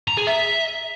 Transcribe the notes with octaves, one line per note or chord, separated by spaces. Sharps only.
A#5
G#4
E5